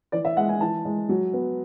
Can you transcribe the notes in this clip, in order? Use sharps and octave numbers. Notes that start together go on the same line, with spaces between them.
E3 D5
E5
G#3 F#5
G#5
E3 A5
G#3
F#3
B3